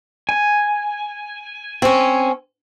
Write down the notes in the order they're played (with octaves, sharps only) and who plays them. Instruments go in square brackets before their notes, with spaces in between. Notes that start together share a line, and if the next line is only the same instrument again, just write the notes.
[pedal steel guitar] G#5
[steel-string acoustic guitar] C4 C#4